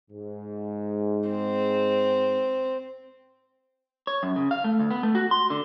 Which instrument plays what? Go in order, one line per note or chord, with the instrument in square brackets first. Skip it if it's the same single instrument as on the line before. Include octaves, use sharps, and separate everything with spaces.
[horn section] G#2
[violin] C4
[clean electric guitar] C#5
F#2
C#3
F5
A3
D2
B3
A3
F#4
C6
D3